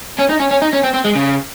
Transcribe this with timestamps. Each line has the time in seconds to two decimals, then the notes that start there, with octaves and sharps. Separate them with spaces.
0.19 C#4
0.30 D#4
0.40 C#4
0.51 C#4
0.62 D#4
0.73 C#4
0.84 C4
0.94 C4
1.05 G#3
1.16 C#3